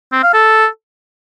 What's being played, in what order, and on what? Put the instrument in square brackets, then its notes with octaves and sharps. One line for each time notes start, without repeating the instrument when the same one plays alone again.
[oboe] C4
F5
A4